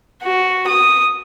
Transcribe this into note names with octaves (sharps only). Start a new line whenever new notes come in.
F#4
D#6